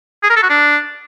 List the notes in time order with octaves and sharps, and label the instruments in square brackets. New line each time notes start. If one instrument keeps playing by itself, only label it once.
[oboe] G#4
A#4
A4
F#4
D4